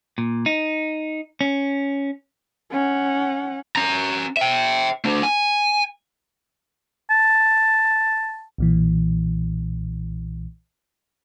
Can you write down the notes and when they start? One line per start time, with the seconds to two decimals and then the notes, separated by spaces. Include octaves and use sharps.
0.18 A#2
0.46 D#4
1.41 C#4
2.72 C#4 F#5
3.76 C#4 A#5
4.37 E5 G5
5.05 A3 D4
5.23 G#5
7.10 A5
8.58 B1 A#2 E3